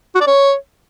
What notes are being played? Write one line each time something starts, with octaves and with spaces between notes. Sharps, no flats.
F#4
D5
C#5